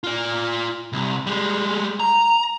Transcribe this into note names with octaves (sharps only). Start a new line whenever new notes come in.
F4 D5
C2 C3
G3 G#3
A#5